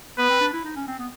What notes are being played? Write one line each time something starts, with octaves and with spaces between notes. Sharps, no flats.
B3 B4
C4
D4
E4
D#4
C#4
C4
B3